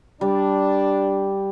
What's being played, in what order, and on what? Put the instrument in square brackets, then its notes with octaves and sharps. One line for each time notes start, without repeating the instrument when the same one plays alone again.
[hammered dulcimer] G3 [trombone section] D4